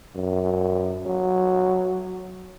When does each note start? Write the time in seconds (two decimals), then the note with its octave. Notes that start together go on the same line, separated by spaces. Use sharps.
0.15 F#2
1.06 F#3